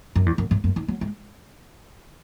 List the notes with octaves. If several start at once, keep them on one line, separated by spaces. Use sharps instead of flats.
F#2
E2
F#2
G#2
F#2
D#3
F#3
G#3